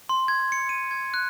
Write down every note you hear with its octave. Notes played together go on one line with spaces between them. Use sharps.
C6
G#6
C#7
D#7
G#6
F#6